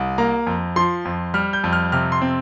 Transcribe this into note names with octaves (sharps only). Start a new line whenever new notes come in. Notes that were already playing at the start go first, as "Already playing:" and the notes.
Already playing: C2
A#3 A#5
F2
F3 C6
F2
G3 F6
G6
F2
F6
C3 F6
C6
C4